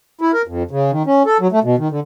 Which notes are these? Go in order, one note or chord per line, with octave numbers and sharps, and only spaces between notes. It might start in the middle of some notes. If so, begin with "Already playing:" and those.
E4
A#4
F2
C#3
D#3
C#4
A4
F#3
A3
B2
D#3
D3